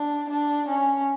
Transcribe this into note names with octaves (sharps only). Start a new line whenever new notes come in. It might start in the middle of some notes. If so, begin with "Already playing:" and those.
Already playing: D4
D4
C#4